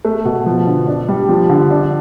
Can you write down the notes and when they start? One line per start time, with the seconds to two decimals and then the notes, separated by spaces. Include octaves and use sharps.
0.05 A3
0.25 B2
0.46 F3
0.67 D3
0.88 D4
1.09 G3
1.29 F3
1.50 D3
1.71 D4